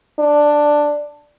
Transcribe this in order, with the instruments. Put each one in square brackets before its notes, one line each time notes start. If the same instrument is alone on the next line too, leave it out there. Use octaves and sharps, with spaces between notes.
[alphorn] D4